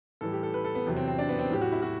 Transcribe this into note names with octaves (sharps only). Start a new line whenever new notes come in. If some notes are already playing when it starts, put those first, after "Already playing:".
A2 E3 G3 A4
G4
A4
B4
A4
B3
E2 C3 F#3
C4
C4
D4
B3
C4
A2 F#3 G4
F#4
E4
F#4